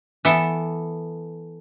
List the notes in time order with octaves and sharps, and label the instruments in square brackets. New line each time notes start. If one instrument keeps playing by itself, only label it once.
[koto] E3 B3 A4